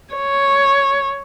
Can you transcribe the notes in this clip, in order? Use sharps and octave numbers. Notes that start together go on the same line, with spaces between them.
C#5